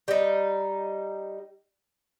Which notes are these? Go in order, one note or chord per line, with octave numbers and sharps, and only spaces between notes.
G3 D#4